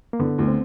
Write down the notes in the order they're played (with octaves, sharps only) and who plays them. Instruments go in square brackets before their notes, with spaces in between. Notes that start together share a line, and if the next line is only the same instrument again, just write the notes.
[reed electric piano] A#3
[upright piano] D3 [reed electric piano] B3
[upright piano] D2
[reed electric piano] C4